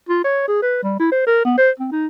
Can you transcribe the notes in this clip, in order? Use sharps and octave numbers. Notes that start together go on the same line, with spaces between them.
F4
C#5
G#4
B4
G3
E4
C5
A#4
B3
C5
C4
D#4